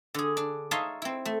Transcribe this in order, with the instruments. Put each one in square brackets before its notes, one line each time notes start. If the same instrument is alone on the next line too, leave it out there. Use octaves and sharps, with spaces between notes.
[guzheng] D3 G#4
D4
D#4 C#5 E5 F5 A5 C6
C4 E4
A3